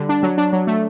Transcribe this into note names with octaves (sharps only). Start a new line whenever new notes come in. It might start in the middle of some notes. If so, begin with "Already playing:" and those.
Already playing: D3 G3
D4
F#3
D4
F#3
A3